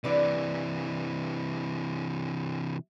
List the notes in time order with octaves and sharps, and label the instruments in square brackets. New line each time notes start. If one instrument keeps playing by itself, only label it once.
[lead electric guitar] C3 E3 [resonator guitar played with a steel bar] D4 B4 D5